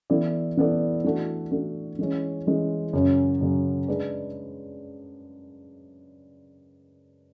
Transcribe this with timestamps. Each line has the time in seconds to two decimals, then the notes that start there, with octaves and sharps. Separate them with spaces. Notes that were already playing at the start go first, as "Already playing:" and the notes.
0.10 E3 B3 E4 A4 D5
0.57 E3 B3 E4 A4 D5
1.04 E3 A3 D4 F#4
1.51 E3 A3 D4 F#4
1.99 E3 G#3 C#4
2.46 E3 G#3 C#4
2.93 F#2 C#3 F#3 C#4
3.41 F#2 C#3 F#3 C#4
3.88 G#3 D4 G#4 B4 D5